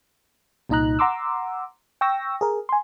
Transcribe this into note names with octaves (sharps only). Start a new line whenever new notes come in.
C2 A#2 D#4 D#5 A#5 F#6
F#5 A#5 C6 D6 E6
G5 C#6 E6 A#6
G#4 A#4
G#5 C6